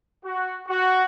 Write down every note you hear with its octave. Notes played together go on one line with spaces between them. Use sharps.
F#4
F#4